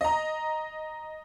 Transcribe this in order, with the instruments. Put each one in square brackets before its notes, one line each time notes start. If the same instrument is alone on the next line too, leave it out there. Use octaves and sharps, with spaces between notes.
[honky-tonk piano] D#5 A#5